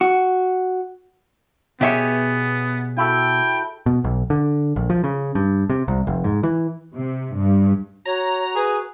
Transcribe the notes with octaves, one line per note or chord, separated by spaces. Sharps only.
F#4
B2 B3 G4 G#4 C#5 E5
E4 F#4 A4 G5
B2
B1
D3
A#1
F3
C#3
G2
C3
C2
F1
G#2
E3
C3
G2
F#4 C#5 A#5
G#4 B4